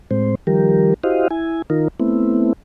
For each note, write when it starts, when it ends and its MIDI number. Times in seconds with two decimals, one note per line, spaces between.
0.11 0.35 45
0.11 0.35 56
0.11 0.35 60
0.11 0.35 72
0.47 0.94 51
0.47 0.94 53
0.47 0.94 55
0.47 0.94 67
0.47 0.94 70
1.04 1.28 64
1.04 1.28 66
1.04 1.28 67
1.04 1.28 72
1.04 1.28 75
1.04 1.28 77
1.31 1.62 64
1.31 1.62 80
1.70 1.88 51
1.70 1.88 63
1.70 1.88 65
1.70 1.88 70
2.00 2.53 57
2.00 2.53 59
2.00 2.53 60
2.00 2.53 64